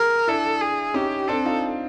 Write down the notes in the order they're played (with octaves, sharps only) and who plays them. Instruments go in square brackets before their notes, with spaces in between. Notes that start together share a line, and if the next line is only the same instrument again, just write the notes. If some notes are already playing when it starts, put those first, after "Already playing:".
Already playing: [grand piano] G#4 [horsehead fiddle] A#4
[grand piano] D4 E4 [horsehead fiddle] A4
[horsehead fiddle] G#4
[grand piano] C#4 D#4 [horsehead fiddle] G4
[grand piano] C4 D4 [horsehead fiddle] A4
[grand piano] D#4 F4